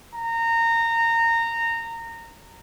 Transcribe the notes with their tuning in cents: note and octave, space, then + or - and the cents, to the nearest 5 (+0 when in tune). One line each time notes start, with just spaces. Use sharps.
A#5 -20